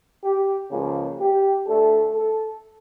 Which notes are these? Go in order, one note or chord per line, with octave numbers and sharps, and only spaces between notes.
G4
C#2 C#3 F3 A#3
G4
D2 D3 A3 A4
A4